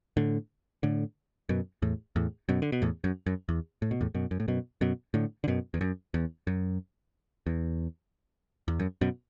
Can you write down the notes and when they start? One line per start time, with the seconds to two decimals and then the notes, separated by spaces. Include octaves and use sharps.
0.17 A2 D3
0.83 A2 D3
1.49 F#2 B2
1.82 E2 A2
2.16 E2 A2
2.49 F#2 B2
2.62 D3
2.72 B2
2.82 E2 A2
3.04 F#2
3.26 F#2
3.49 E2
3.82 A2
3.91 B2
4.01 E2 A2
4.15 F#2 B2
4.31 F#2
4.40 A2
4.48 F#2 B2
4.81 F#2 B2
5.14 A2 D3
5.44 D3
5.48 F#2 B2
5.74 E2
5.81 F#2
6.14 E2
6.47 F#2
7.47 E2
8.68 E2
8.80 F#2
9.01 F#2 B2